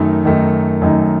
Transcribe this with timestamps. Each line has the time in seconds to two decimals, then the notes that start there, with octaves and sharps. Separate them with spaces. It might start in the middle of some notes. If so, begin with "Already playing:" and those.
Already playing: F#2 D#3 A3 D#4
0.25 F#2 D#3 A3 D#4
0.82 F#2 D#3 A3 D#4